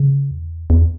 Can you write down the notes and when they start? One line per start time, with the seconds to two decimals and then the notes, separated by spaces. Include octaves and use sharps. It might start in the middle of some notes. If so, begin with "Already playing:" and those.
Already playing: C#3
0.31 E2
0.70 E2